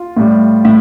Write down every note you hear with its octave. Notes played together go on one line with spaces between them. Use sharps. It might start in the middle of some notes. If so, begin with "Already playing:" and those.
Already playing: F4
A2 G3
A2 E4 E5